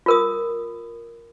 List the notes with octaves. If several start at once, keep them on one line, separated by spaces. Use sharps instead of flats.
F4 A#4 D#6